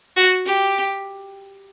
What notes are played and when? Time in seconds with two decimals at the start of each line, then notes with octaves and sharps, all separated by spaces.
0.16 F#4
0.46 G4